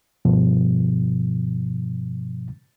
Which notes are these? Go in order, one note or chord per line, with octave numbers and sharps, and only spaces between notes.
G2 B2 F3